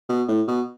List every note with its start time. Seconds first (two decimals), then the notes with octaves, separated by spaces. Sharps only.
0.09 B2
0.28 A2
0.48 B2